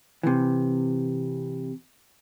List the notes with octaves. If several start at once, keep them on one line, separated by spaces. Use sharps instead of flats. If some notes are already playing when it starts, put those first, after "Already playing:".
C3 E3